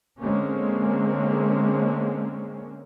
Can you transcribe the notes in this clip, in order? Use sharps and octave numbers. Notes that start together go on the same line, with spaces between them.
D3 G#3 A#3 C4 C#4